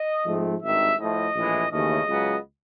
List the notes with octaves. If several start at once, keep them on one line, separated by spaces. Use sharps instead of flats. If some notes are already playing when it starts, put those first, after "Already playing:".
Already playing: D#5
G#2 F3 A3 C4
G#1 G2 D#3 E5
A2 F3 A3 D#5
A#1 A2 E3 G#3
D#2 C#3 E3 A3 C#4 D#5
C#2 C#3 F#3 B3